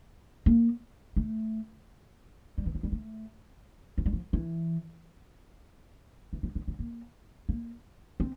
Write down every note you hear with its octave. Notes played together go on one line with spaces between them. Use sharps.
A#3
A3
G3
E3
F3
G3
A3
F3
G3
F3
E3
E3
F3
E3
F3
A#3
A#3
C4